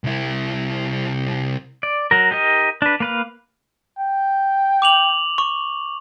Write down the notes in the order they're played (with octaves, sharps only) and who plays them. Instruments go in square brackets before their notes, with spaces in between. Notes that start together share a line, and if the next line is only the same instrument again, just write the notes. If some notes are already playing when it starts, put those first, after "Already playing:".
[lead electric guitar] C2 E4
[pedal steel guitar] D5
F#3 A#4
D#4 G4 A#4 D#5
D4 B4
A#3 B4 F5
[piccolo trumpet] G5
[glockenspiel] D6 F7 F#7
C#6